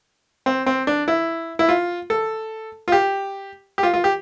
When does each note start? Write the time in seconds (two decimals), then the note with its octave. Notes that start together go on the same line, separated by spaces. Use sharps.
0.46 C4
0.66 C4
0.87 D4
1.08 E4
1.59 E4
1.69 F4
2.10 A4
2.88 F4
2.92 G4
3.78 G4
3.83 F4
3.94 F4
4.04 G4